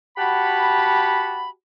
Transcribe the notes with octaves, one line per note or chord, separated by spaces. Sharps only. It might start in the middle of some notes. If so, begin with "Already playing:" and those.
F#4 G4 F#5 A5 B5